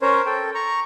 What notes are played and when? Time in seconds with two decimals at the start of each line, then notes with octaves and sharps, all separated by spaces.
0.02 C#4 A#4 C5 C#5
0.26 A4 G5
0.55 A#5 C#6